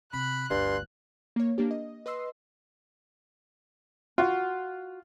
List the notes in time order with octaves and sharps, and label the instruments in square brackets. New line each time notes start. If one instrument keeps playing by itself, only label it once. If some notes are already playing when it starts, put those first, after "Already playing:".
[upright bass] C3 [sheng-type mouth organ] B5 [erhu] F#6
[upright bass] G1 D2 [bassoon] G2 [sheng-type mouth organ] C6
[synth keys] A#3 C#5
A#3 D4 G4
D#5
B4 D#5 C6 E6 C7
[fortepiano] F4 [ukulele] F#4